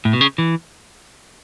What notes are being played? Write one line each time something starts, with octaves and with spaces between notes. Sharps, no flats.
A2
B2
C#3
E3